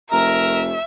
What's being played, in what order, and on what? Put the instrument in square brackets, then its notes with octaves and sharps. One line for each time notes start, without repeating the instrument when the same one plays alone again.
[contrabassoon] F1 [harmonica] A#4 A#5 [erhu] E5